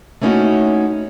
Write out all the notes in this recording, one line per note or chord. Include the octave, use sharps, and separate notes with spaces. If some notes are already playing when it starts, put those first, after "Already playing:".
A3 A#3 C#4 D#4 E4 F#4